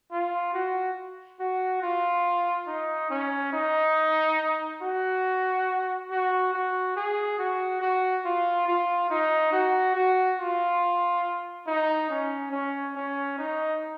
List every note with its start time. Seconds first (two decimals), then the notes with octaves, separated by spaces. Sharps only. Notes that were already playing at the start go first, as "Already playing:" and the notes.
0.11 F4
0.54 F#4
1.40 F#4
1.82 F4
2.67 D#4
3.10 C#4
3.53 D#4
4.82 F#4
6.11 F#4
6.53 F#4
6.96 G#4
7.39 F#4
7.81 F#4
8.25 F4
8.68 F4
9.10 D#4
9.52 F#4
9.95 F#4
10.39 F4
11.67 D#4
12.10 C#4
12.52 C#4
12.96 C#4
13.38 D#4